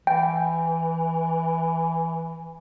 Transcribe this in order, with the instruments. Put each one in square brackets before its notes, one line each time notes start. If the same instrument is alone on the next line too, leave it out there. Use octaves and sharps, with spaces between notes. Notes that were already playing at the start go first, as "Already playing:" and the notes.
[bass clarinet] E3 [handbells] G5